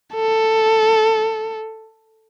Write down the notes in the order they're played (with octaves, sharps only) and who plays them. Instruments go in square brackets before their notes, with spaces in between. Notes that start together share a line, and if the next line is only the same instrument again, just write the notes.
[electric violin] A4